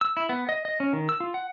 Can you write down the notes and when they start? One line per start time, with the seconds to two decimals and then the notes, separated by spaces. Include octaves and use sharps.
0.01 E6
0.17 E4
0.29 B3
0.49 D#5
0.65 D#5
0.80 C#4
0.93 D#3
1.09 E6
1.20 F4
1.34 F#5